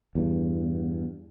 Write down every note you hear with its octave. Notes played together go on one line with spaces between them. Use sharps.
E2 G2